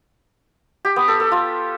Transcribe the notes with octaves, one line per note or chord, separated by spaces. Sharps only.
G4
B3
A4
A4
F4